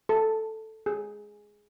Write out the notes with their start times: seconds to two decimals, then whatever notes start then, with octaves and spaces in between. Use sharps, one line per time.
0.09 A4
0.86 G#4